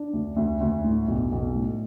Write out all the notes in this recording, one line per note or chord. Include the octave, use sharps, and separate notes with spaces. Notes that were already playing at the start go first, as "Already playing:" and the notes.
Already playing: D4
D2
D2
D2
A2
B1
B1
A2